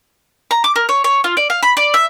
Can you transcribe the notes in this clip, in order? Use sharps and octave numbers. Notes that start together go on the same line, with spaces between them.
A#5
D6
A#4
C#5
C#5
F4
D5
F5
B5
D5
E5